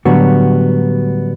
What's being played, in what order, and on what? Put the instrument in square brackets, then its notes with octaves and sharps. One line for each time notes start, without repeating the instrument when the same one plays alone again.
[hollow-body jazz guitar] A2 D3 F#3 G3 B3 F#4